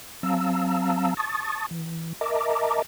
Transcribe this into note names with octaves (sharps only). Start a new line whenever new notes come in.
F#3 C4 F5 A5 A#5 E6
A5 C#6 D#6 A6
E3
A#4 D#5 E5 A5 A#5 D6